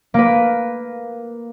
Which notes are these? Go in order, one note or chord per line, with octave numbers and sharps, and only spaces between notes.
A#3 B4